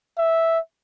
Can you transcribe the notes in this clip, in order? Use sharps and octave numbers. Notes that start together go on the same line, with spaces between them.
E5